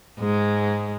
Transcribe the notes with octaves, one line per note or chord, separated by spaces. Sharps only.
G#2 G#3